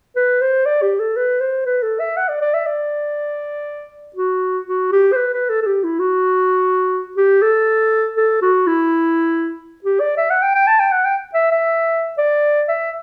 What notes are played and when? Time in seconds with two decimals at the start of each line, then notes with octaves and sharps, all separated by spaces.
0.16 B4
0.41 C5
0.66 D5
0.82 G4
1.00 A4
1.16 B4
1.41 C5
1.66 B4
1.83 A4
2.00 E5
2.17 F#5
2.28 D5
2.41 D5
2.54 E5
2.66 D5
4.16 F#4
4.67 F#4
4.92 G4
5.12 C5
5.16 B4
5.33 B4
5.49 A4
5.62 A4
5.66 G4
5.84 E4
5.99 F#4
7.17 G4
7.42 A4
8.17 A4
8.42 F#4
8.67 E4
9.84 G4
10.00 D5
10.17 E5
10.30 F#5
10.42 G5
10.55 G5
10.67 A5
10.80 G5
10.92 F#5
11.05 G5
11.34 E5
11.51 E5
12.18 D5
12.68 E5